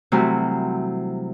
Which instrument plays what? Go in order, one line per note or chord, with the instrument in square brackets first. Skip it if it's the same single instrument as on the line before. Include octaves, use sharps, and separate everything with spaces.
[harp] C3 E3 F#3 G3 A3 C4